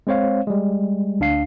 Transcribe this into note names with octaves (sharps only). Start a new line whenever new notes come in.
G#3 C4 C5 C#5 F5
G3 G#3
D2 D4 F5 C7